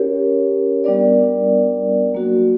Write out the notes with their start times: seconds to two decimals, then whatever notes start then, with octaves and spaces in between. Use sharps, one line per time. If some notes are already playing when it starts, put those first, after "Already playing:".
Already playing: C#4 G4 A#4 C#5
0.84 G3 B3 D4 A#4 D5
2.14 F#3 A#3 D4 F#4